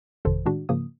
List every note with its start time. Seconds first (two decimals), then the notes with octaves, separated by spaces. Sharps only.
0.25 G#1 F2 C3 D#3 A4 C5
0.46 A2 D#3 G#3 D4 F#4
0.69 G#2 C#3 F3 A#3 D#6